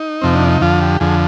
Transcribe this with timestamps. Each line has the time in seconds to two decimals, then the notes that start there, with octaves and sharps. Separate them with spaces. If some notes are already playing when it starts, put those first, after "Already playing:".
Already playing: D#4
0.21 F2 C3 F3 C4
0.35 D4
0.48 D#4
0.61 F2 D3 F3 F4
0.82 G4
1.00 F2 D3 F3 G#4